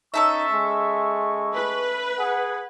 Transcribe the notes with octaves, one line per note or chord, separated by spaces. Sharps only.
C#4 D#4 A4 E5 C#6
G#3
B4
G#4 F#5